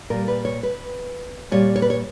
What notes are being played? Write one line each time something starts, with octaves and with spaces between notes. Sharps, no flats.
A#2 G3 A#4
B4
C#5
B4
A#2 G3 C#5
C#5
B4
C#5